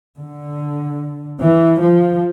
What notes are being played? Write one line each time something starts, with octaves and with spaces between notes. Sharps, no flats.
D3
E3
F3